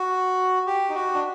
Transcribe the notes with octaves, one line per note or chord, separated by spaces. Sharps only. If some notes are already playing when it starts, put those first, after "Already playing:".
Already playing: F#4
G4
D#4
F#4
D4